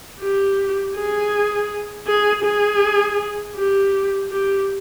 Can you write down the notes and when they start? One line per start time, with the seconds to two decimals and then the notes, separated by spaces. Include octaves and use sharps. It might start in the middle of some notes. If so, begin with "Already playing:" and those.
0.20 G4
0.95 G#4
2.07 G#4
2.45 G#4
3.56 G4
4.31 G4